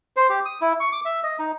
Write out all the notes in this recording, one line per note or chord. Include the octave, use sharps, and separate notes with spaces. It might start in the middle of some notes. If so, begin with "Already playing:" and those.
C5
G4
D#6
E4
C#6
D6
E5
D#5
D#4